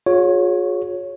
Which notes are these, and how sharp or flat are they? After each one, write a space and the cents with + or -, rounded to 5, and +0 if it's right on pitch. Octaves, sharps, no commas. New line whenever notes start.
F4 +45 G#4 +0 C#5 +0